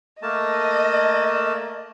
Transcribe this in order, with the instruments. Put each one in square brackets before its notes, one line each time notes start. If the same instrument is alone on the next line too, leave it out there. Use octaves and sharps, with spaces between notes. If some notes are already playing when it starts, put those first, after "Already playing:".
[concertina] A3 A#3 A5 [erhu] D#5